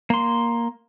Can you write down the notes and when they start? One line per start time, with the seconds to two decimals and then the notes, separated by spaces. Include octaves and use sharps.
0.10 A#3 C6